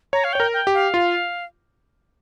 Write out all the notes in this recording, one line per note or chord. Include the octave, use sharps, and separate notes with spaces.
C#5 A#5
F5
C#5 G5
A#4
G5
G4
F5
F4